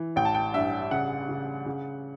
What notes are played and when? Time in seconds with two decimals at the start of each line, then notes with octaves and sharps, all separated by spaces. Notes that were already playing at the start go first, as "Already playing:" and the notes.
Already playing: E3
0.16 A1 G5
0.25 A5
0.34 G5
0.54 G2 E5
0.91 C#3 F#5
1.29 C#3
1.66 C#3